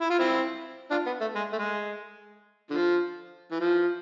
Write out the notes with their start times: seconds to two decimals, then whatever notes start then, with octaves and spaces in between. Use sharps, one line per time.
0.01 E4
0.10 F4
0.19 C4 E4
0.91 D4 F4
1.06 B3
1.21 A3
1.35 G#3
1.53 A3
1.58 G#3
2.70 D3 F3
3.51 E3
3.60 F3